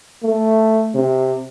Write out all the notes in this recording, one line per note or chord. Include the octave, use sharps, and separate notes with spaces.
A3
C3